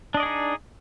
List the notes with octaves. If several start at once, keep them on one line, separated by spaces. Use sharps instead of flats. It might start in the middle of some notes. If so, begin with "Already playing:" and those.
D4 D#4 G#4 D5 D#5